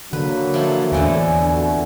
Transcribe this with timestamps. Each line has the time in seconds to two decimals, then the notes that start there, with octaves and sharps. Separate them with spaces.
0.13 D3 F#3 A#3 D4 B4
0.54 F3 E4 A4
0.92 E2 A2 D3 E3 G#5
1.50 F2 F#4